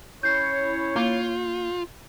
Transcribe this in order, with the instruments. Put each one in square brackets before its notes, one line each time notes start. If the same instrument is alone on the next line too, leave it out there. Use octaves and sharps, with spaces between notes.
[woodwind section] C#4 E4 C#5 [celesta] G6 C7
[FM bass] A#3 [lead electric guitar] F4